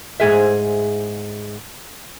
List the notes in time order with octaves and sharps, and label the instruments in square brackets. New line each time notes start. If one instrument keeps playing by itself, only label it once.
[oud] G#2 G#4 E5